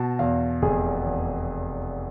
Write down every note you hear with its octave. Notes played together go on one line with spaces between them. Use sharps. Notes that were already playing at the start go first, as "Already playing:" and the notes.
Already playing: B2 A5
E2 F5
F1 G#4
E2